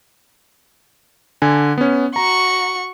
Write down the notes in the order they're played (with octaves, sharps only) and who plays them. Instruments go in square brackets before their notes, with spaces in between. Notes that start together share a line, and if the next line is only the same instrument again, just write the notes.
[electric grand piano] D3 G#5
B3 C#4
[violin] F#4 C#6 [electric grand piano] A#5